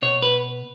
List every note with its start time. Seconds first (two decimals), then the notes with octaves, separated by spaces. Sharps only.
0.02 B2 C#5
0.22 B4